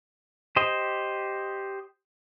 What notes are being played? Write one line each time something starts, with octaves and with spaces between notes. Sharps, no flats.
G4 C5 D#5